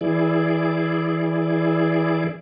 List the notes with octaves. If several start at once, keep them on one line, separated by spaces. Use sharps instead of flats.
E3 E4 G#4 D5